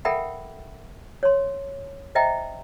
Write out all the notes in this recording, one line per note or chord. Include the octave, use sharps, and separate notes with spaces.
A4 A#4 E5 F#5 G5 B5
C#5 C6
C5 D#5 E5 G5 A#5